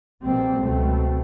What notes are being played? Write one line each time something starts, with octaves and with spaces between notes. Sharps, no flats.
A#1 B2 G3 A#3 C4
C#2 B2 F#3 A3 C4